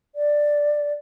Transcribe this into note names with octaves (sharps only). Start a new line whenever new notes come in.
D5